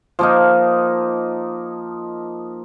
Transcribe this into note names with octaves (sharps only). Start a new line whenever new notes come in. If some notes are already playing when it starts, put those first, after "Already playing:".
F3 A#3 D#4